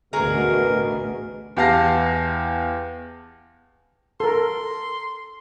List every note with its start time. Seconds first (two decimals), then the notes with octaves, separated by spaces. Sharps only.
0.13 A1 D2 B2 F#4 G#4 A#4 A#5
1.57 E2 G4 F5 A5 A#6 C7
4.20 A4 A#4 C6